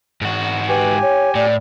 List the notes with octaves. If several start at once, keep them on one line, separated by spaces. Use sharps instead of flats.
G#2 F#4
G4 B4 G#5
C#5
A2 D5